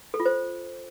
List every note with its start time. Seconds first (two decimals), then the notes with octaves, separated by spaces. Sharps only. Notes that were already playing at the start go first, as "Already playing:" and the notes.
0.14 A4
0.20 F4
0.25 C5